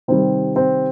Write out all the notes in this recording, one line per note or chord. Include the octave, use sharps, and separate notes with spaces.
C3 D#3 G3 C4
C4